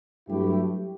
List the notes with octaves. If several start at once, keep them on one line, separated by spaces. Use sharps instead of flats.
G2 F#3 A3 E4 G4